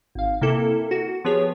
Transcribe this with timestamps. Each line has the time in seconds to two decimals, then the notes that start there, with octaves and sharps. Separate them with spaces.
0.15 G#1 F5
0.41 C3 A#3 E4 A4
0.91 F#4
1.25 F3 B3 G4 G#4 C#5